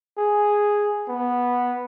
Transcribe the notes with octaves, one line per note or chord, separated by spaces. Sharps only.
G#4
B3